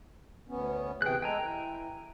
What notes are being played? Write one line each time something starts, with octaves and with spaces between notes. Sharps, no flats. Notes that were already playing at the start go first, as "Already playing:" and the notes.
D2 B3 C#4
C3 E3 G#4 G5 F#6
G#3 A4 G5 G#5 A#5
E3